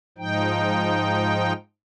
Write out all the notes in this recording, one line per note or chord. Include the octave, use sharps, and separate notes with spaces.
G#2 F3 D#4 G5